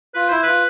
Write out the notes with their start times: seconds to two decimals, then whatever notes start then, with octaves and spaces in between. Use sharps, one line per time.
0.14 F4 B4
0.29 E4 C5
0.43 F4 B4